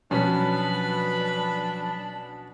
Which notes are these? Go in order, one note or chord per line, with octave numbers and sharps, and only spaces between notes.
B2 F3 F#3 C#4 D4 B4 B5